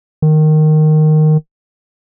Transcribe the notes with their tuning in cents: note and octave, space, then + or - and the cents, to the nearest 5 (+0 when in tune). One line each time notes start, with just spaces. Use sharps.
D#3 -10